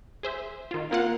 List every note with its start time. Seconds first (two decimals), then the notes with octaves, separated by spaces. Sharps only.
0.23 G#4 C5 E5
0.71 D#3 F4
0.91 A#3 C4 F4 F#5